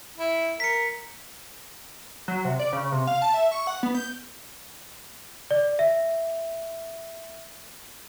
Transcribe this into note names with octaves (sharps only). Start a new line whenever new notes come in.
E4
A#4 B6 C#7
F#3
C3
D5
C#3
C3
F5
A5
E5
C#6
F#5
B3
G6
D5
E5